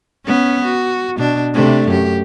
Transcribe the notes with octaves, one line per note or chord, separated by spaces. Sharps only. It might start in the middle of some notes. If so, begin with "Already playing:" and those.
B3 C#4
F#4
B2 D4
C3 A3 D4
F#2 G4